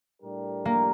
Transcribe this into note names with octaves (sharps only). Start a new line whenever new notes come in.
A2 G3 D4 G4 A#4
A#3